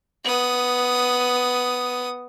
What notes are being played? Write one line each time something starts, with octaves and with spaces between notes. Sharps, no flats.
B3 D#6